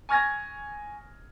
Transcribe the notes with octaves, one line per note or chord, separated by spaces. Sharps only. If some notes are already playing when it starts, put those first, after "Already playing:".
G#5 C#6 F6 G#6 A#6